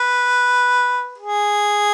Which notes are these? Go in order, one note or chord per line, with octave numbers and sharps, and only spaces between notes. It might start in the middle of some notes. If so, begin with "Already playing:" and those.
Already playing: B4
G#4